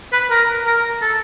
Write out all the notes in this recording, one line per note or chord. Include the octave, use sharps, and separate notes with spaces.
B4
A#4
A#4
A4